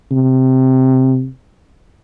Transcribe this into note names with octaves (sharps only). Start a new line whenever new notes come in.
C3